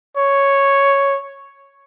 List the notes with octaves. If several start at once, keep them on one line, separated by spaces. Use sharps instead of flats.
C#5